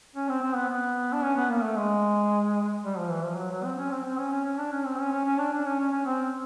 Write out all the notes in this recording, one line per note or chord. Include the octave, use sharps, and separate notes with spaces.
C#4
C4
C4
B3
B3
D4
C#4
B3
A#3
A3
G#3
G3
F3
E3
F3
F#3
F#3
C4
C#4
C4
C4
C#4
C#4
C#4
D4
C#4
C4
C#4
C#4
C#4
D4
D4
C#4
C#4
C#4
C4